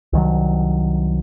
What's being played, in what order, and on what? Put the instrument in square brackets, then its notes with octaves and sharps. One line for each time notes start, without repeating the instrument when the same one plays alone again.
[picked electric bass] C2 D#3 F#3